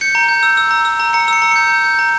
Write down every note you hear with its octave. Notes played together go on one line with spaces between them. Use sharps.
G6 C#7
A#5
G6
E6
E6
A#5
E6
A#5
A#5 C#7
E6 C#7
A#5
G6 C#7
G6
G6
A#5